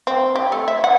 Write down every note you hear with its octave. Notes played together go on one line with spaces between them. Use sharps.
C4
G4
A3
E5
F#5